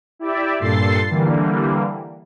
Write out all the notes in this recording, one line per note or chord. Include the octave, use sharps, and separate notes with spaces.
E4 G4 D5 E5
G2 A#2 A4 C6 A6 C7
D3 E3 G3 A#3